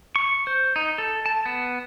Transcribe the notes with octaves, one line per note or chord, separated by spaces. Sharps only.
C#6
C5
D#4
A4
A5
B3